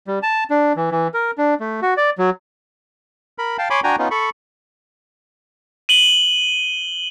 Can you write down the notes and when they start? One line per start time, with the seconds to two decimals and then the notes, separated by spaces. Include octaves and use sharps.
0.07 G3
0.23 A5
0.50 D4
0.76 E3
0.91 E3
1.14 A#4
1.38 D4
1.60 A3
1.82 F#4
1.97 D5
2.18 F#3
3.38 A#4 B5
3.58 F5 G5 A5
3.70 C#5 G#5 B5 C6 D6
3.84 D4 F#4 G5 G#5 A#5
3.99 B3 C#4 D#4 F4
4.11 A4 B5 C#6
5.89 D#7 F#7 G7